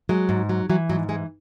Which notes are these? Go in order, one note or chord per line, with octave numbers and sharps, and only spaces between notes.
F#3 G#3
G#2
F#3
E3 F#3
G#2 F#3
E3 G#3